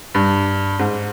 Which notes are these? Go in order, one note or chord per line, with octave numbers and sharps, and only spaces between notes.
G2
G#2